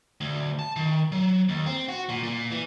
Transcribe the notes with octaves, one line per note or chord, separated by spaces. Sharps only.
D2
A5
D#3
F#3
D#2
C4
F#4
A#2
A#2
E3